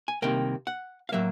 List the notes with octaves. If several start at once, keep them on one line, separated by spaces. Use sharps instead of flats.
G#5
C2 C3 D#3 A#3 G5
F#5
F5
A2 F#3 A#3 E5